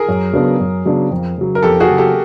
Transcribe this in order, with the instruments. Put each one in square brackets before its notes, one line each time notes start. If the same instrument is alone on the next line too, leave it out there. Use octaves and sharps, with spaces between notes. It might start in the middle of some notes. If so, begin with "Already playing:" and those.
Already playing: [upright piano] G#4 A#4
[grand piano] F#2
C#3 F#3 B3 D4
F#2
C#3 F#3 B3 D4
F2
C#3 F#3
[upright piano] A#4
[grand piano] F2 [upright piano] G4 A4
[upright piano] F#4 G#4
[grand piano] C#3 F#3
[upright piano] G4 A4